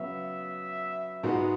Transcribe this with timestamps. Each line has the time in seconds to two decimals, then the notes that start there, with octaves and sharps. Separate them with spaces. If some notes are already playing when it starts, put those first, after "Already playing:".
Already playing: C#3 F#3 B3 F#4 E5
1.23 G#2 G#3 B3 F#4